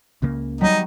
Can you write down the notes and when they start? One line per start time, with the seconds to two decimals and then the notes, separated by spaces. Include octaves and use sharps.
0.22 C#2 C#3 A#3
0.61 F#3 G3 B3 D#4